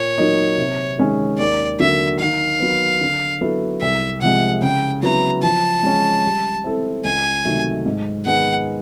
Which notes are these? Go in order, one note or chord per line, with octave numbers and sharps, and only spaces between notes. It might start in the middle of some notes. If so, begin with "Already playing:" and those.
Already playing: A#2 C#5
F#3 A#3 D#4
C3
D#3 G#3 C#4
D#2 D5
D3 F#3 A#3 E5
D#3 F5
F#3 B3
D3
F#3 B3 E4 A4
C2 E5
C3 F3 G#3 F#5
C#3 G5
F#3 B3 E4 A#5
F3 A5
G#3 C#4
G3
C4 E4 A4
C#2 G#5
C3 D#3 F#3 A3
G#2
D#3 G#3 B3 F#5